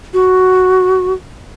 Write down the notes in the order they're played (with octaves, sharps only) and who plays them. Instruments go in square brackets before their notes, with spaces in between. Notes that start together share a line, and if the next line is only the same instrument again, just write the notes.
[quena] F#4